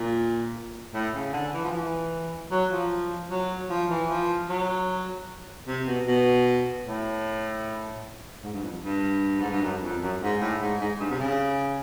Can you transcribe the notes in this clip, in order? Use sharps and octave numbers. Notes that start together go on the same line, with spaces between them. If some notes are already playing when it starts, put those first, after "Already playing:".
Already playing: A#2
A2
C#3
D3
E3
F3
E3
F#3
F3
F#3
F3
E3
F3
F#3
C3
B2
B2
A2
G#2
G2
F2
G2
G#2
G2
F#2
F2
F#2
G#2
A2
G#2
G#2
G2
C3
C#3